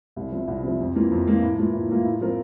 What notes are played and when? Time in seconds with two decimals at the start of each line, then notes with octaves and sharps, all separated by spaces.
0.16 C2
0.32 C3 F3
0.48 C2
0.63 C3 F3
0.80 F2
0.95 E3 A#3 F4
1.11 F2
1.27 E3 A#3 F4
1.42 A2
1.58 E3 A#3 F4
1.74 A2
1.89 E3 A#3 F4
2.05 A2
2.21 F3 C4 F4 A#4